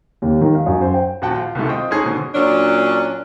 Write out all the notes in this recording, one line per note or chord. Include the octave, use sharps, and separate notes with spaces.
D#2
D#3
F5
F#2
C5
G5
D#1 F3 F#4 F#5 G5 A5
F4
C2 B2 D#3 G#3 A3
C4 F4 C5 D#5 G5
G#3 C#4 D#4 G#4 A4 C5
G#2 B2 D3
A#2 F#3 C#4 D4